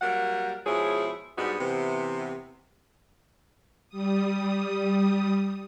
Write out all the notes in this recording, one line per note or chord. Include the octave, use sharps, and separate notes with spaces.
F#3 G3 A#3 A#4 F#5
B2 F3 G#3 E4 G#4 C#5
G#2 G3 B3 D4 D#4 F#4
C3 E3 B3
G3 D#6